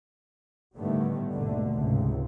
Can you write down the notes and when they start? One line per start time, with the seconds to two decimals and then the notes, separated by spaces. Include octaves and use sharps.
0.77 A2 D3 D#3 G3 A3 B3
1.31 G#1 D#2 G#2 B2 D3 A3
1.76 C#2 G#2 C3